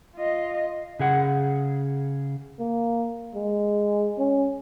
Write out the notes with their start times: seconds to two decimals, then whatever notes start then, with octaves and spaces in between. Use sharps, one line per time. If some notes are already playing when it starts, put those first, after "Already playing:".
0.15 F4 D#5
1.00 C#3 G#4 F#5
2.59 A#3
3.35 G#3
4.19 C#4